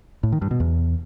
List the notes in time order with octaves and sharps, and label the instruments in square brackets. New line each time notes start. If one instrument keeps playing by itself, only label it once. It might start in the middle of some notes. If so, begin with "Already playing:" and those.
[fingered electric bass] A2
D#3
G2
B2
E2